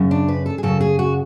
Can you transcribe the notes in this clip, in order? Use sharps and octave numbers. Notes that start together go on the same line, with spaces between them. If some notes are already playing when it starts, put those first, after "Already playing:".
Already playing: F#2 C#3
D4
B4
A4
G#4
F#2 C#3 A4
G#4
F#4